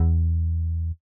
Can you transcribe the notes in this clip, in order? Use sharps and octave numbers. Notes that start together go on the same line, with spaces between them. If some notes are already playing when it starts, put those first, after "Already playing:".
Already playing: E2